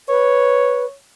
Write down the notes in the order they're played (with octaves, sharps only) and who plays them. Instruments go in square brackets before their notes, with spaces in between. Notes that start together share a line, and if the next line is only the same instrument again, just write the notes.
[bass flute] B4 [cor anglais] C#5